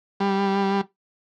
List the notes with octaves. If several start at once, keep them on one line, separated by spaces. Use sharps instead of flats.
G3